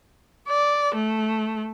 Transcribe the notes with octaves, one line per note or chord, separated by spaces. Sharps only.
D5
A3